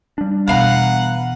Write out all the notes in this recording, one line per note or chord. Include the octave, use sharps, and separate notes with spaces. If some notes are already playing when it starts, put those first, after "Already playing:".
G3 D4
E2 B2 B4 F5 F#5 A#5